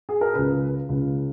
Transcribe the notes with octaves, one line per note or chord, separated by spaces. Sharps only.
G#4
A#4
C#2 C#3 B4
C#2 C#3